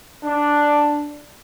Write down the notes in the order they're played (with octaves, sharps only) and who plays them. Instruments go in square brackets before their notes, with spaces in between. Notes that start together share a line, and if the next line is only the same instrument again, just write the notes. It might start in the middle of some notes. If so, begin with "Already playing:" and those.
[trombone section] D4